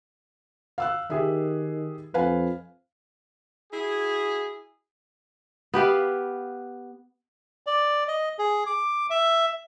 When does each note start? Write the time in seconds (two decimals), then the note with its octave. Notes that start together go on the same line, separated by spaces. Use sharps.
0.78 F5 E6 F#6
1.10 D#3 G4 G#4 E5
2.14 F2 B4 F5 G#5
3.72 E4 F#4 G#4
5.74 B3 G4 B4 F5
7.67 D5
8.08 D#5
8.39 G#4
8.66 D6
9.10 E5